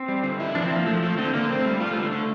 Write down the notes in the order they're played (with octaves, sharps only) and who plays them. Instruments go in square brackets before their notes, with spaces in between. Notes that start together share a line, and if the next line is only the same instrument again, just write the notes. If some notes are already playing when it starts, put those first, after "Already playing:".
Already playing: [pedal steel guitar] C4
[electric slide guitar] G3
D3
E4
[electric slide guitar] F3 [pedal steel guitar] D4
[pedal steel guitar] C4
[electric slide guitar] F3
[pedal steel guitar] A#3
[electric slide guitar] F3 [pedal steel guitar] A3
[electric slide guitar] F3 [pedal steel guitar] A3
[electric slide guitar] D3 [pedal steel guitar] C4
[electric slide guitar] D3 [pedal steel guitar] A#3
[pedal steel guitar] A3 [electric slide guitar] C4
[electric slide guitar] G3
[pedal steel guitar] G3 [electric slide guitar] F4
[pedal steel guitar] A3
[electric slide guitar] D3
[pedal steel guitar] A3
[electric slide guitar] D3